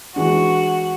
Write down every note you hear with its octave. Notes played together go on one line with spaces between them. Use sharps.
E3 G#3 D4 F#4